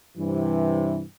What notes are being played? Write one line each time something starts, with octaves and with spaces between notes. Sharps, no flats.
G2 C3 E3